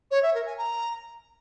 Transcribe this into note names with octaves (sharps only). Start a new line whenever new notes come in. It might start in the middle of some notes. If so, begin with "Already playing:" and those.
C#5
E5
A#4
G#5
A#5